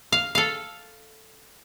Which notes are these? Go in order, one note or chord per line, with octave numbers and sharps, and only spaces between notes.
F5
A4 F5